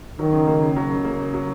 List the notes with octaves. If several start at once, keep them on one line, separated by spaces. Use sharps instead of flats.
D#3 F#3
C#3
A#3
C#3
F#3
C#3
A#3
C#3
F#3